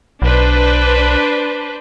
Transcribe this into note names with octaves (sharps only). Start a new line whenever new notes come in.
B1 D4 B4 C5